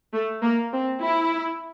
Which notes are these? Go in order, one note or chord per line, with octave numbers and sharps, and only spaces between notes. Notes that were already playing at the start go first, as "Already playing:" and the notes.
A3
A#3
C4
E4